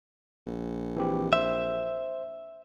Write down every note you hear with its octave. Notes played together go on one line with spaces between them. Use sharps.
A#1
E3 C4 G4
C5 E5